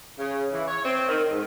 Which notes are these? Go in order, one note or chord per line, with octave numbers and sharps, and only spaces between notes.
C#3
E3
C#5
C4
D#3
G#2